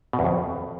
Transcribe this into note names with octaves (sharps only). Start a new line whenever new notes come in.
B2
E2
F2